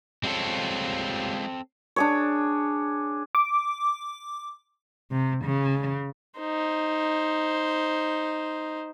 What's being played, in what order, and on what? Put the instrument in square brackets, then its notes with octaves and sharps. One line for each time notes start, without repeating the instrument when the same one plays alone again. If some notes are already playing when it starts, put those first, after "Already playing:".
[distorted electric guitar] G3 C#5 [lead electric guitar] G#3 F4 [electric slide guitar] C4 A4
[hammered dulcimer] D4 G#4 C#5
[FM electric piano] D6
[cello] C3
C#3
[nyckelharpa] D#4 C5